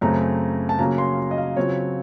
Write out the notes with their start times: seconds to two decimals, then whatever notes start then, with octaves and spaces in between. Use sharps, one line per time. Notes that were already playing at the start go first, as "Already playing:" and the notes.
0.01 F#2 C#3 A3 C4 A#5
0.69 A5
0.79 C#3 F#3 A#3 C#4 A#5
0.98 C6
1.31 D#5
1.38 F5
1.56 C#3 F#3 C4 F4 C#5